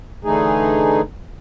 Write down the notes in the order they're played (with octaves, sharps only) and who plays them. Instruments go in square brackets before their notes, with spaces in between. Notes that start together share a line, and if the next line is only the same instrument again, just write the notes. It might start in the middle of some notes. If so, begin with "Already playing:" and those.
[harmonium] D3 E3 A3 D#4 G#4